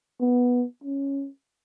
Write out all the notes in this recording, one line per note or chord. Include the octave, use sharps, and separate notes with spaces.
B3
C#4